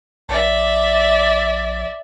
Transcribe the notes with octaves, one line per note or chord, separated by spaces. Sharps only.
A#1 D5 E5